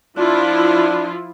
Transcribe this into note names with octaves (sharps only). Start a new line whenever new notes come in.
F3 D4 E4 F4